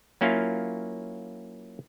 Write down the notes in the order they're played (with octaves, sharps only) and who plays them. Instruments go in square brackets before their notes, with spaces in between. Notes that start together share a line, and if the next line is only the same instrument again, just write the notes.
[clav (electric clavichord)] F#3 A#3 C#4 E4 F4 F5